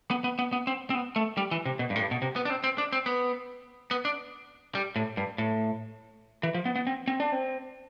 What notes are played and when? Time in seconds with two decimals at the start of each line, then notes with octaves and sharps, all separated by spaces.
0.11 B3
0.24 B3
0.39 B3
0.53 B3
0.67 C4
0.90 C4
0.95 B3
1.16 A3
1.37 G3
1.51 E3
1.65 C3
1.79 B2
1.90 G2
1.96 A2
2.00 G2
2.11 B2
2.22 C3
2.36 B3
2.45 D4
2.50 C4
2.64 C4
2.78 D4
2.93 C4
3.06 B3
3.91 B3
4.05 D4
4.75 G3
4.96 A2
5.17 G2
5.38 A2
6.43 E3
6.54 F3
6.65 B3
6.76 B3
6.87 C4
7.08 C4
7.20 D4
7.32 C4